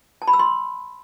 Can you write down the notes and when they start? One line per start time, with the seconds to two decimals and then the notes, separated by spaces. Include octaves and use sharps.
0.22 A5
0.28 B5
0.33 E6
0.39 C6